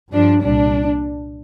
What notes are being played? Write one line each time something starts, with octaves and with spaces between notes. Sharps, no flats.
G2 F3 D4
C2 A#2 G3 D4